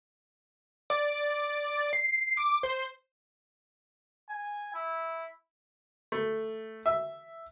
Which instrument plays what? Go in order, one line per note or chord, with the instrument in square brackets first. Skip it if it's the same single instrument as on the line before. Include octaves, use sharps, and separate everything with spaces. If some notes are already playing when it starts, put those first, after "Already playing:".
[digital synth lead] D5
C7
D6
C5
[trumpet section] G#5
E4
[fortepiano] A3
E5